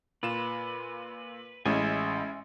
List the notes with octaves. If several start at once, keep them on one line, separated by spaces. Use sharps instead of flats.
A#2 F4 B4 E7
A1 G#3 C#4 E4 E5 G#5